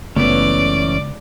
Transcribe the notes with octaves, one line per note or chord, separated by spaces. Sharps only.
F#1 C#2 E3 A3 B3 C#4 D5